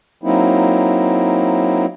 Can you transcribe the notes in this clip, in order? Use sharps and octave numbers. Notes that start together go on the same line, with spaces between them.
F#3 A#3 C4 D#4 E4